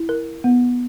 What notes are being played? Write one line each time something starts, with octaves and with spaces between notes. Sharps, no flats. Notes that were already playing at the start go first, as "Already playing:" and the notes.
Already playing: E4
A#4
B3